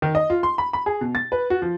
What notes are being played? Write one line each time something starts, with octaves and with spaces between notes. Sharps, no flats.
D#3
D#5
F4
C6
B5
B5
G#4
B2
A6
B4
F#4
F3